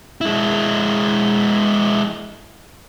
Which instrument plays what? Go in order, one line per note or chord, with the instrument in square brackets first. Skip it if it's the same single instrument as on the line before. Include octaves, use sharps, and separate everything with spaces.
[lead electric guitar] G#3 E4